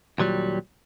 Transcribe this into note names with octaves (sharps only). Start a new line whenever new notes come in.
D#2 A#2 F#3 G3